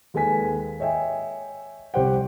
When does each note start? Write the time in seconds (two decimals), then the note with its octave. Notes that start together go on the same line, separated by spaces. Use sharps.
0.14 D#2 G#3 A4 B4 G#5 B6
0.80 C#5 D#5 E5 G5 G#5
1.94 C2 G3 G4 C5 F#5 G5